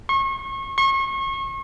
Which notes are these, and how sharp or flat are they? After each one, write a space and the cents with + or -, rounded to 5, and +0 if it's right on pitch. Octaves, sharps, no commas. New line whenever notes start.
C#6 -35
C#6 -35